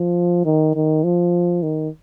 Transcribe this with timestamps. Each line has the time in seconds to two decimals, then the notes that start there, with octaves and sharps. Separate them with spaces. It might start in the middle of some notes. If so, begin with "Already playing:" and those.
Already playing: F3
0.45 D#3
0.75 D#3
1.04 F3
1.63 D#3